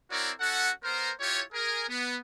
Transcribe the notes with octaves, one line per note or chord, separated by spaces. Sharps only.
C4 E4 F#4 A#4 C#5 D5
C#4 F#4 A4 F#5
B3 A#4 C5
E4 F4 G4 C#5
G#4 A#4
B3